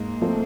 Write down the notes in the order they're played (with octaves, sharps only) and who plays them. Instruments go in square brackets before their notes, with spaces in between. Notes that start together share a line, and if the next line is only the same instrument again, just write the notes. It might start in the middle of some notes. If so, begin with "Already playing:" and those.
Already playing: [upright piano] G#2 [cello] A#3
[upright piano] F3 A3 C4